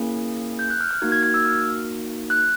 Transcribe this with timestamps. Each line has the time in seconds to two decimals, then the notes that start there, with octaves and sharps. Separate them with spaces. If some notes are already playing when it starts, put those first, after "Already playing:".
Already playing: A#3 C#4 E4 G#4
0.59 G6
0.70 F#6
0.81 F6
0.91 F6
1.02 A#3 D#4 F#4 G#6
1.12 G#6
1.23 G#6
1.34 E6
1.45 F6
2.30 F#6